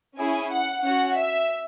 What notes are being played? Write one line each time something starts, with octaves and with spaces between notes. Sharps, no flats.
C#4 E4 G#4 G#5
F#5
C#4 F#4 F#5
E5